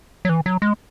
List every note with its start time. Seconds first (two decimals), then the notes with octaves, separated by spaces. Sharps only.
0.25 F#3
0.29 E3
0.46 F#3
0.62 G#3